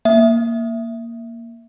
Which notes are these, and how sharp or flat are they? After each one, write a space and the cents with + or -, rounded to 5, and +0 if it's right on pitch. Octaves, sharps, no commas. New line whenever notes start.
A#3 +0 E5 +0